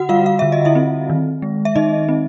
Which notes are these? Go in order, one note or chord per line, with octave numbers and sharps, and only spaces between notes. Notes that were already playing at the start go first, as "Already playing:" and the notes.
Already playing: D3 F#4 F#5
G3 F4 F5
F5
D3 E5
D#5
E4 E5
C4
D#3
G#3
E5
D#3 D#4 D#5
C4